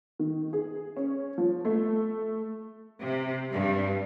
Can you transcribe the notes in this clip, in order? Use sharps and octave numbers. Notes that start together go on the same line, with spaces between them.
D#3
G#4
C#4
F3
A3
C3
G2